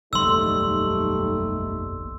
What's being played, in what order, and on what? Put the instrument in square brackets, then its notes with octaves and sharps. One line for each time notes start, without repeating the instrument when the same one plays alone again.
[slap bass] F#1 B1 E2 [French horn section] G3 A3 D#4 [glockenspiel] C6 E6